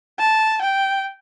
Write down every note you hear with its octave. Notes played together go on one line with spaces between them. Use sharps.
A5
G5